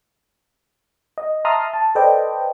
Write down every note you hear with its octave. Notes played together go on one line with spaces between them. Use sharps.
D#5
E5 A5 A#5 C6 D#6 F6
A5
A4 B4 C5 D5 D#5 G5